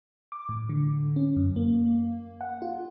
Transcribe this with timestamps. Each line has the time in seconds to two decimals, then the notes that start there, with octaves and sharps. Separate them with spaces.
0.32 D6
0.49 A2
0.69 D3
1.16 C#4
1.36 F#2
1.56 A#3
2.41 F#5
2.62 F4